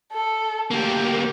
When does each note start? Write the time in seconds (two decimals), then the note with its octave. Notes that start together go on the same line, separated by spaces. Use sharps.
0.13 A4
0.71 D2 A#3 G4